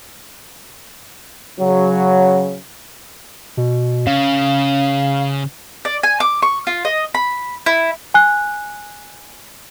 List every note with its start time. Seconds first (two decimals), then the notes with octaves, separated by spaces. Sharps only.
1.60 C#3 F#3
3.57 B2
4.07 C#3 F5
5.85 D5
6.03 G#5
6.20 D6
6.42 C#6
6.67 F4
6.85 D#5
7.15 B5
7.66 E4
8.14 G#5 F#6